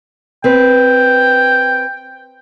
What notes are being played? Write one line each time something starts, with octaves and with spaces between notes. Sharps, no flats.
C4 B4 G5